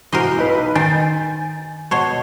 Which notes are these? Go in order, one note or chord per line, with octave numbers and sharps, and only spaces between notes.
E3 F#4 A#4 C5 D#5
B1 D#4 B4
D#3 C5 G5 G#5 G6 A6
B2 C5 C#5 A5